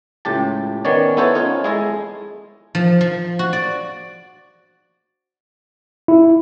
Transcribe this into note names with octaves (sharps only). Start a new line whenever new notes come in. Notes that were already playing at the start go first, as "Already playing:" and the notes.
C#2 A2 G4 A5
D#3 B3 C#4 C#5 D5
B3 E4 A4 C5 C#5
C#4 D#4 F4 C#5
G#3 E4 G#4 A4 D#5
F3
F3
F#4
D5
E4